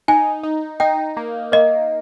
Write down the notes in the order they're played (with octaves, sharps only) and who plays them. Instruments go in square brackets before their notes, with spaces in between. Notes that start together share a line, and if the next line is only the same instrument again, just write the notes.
[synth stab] D#4 [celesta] G#5
[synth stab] D#4
[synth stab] D#4 [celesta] G5
[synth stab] A#3
[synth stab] A#3 [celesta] D#5